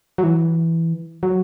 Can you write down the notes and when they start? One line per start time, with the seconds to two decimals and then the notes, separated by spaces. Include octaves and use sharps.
0.18 F#3
0.23 E3
1.23 F#3